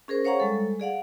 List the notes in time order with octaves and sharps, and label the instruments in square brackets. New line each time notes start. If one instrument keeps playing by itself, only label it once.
[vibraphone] C#4 G#4 A#4 C5
C5 C#5 F5 F#5 A#5 C#6
G3 G#3 A4
G#4 D5 F5 F#5